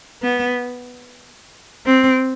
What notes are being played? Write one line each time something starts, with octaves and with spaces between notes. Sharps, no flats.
B3
C4